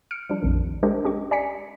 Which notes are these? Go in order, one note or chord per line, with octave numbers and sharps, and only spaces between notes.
F6 C#7 D7
F3 G3 D4
A#1 F2 D#3
G#3 D4 G4 A#4 C5 D#5
C#4 G4 D#5 C#6
D5 G#5 A#5 B6 C#7